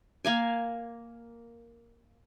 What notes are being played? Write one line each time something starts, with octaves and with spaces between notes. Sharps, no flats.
A#3 F5 G#5